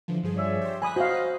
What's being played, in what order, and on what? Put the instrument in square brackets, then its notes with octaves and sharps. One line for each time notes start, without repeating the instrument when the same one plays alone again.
[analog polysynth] D3 E3 F3
G2 F3 G#4
[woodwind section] C#5 D5 E5
[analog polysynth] G4 C5
[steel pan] G#5 B5 D#6 [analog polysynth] F#6 B6
[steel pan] F#4 F5 [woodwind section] C5 D#5